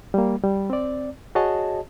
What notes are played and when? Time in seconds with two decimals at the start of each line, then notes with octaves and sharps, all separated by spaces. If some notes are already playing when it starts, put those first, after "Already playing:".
0.14 G3 A#3
0.43 G3
0.70 C4 D5
1.35 F#4 G#4 C#5 D#5 A5